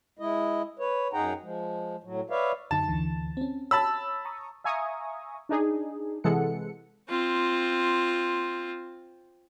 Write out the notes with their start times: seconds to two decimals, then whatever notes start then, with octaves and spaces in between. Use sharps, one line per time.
0.19 G#3 E4 D#5
0.79 B4 C#5
1.13 F#2 D#4 G#4 F#5 G5 A#5
1.42 F3 G#3
2.04 A2 F#3
2.30 B4 C#5 D5 E5 F5
2.71 F#2 D3 D#4 A5
2.88 D2 D3 E3
3.37 C4 C#4
3.71 C#5 A5 B5 E6
4.25 A#5 C#6 D#6
4.64 E5 F5 G#5 A#5 C#6 D#6
5.49 D4 D#4 G#4
6.24 C3 E3 G#3 A4 F#5 C#7
7.09 C4 F4